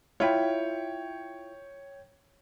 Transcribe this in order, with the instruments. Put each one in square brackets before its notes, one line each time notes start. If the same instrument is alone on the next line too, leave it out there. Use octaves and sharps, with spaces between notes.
[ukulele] E4 F4 [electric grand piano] C#5 G5